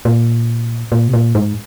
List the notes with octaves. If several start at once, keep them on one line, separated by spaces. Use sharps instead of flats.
A#2
A#2
C3
A#2
G#2